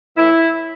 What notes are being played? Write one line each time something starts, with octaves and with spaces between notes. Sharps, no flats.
A2 E3 E4